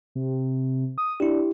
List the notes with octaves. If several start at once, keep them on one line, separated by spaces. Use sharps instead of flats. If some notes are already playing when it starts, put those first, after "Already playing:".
C3
D#6
D4 E4 G4